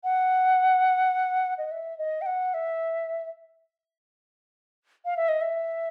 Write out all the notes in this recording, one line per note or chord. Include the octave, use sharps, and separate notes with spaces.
F#5
D#5
E5
D#5
G5
F#5
E5
F5
E5
D#5
E5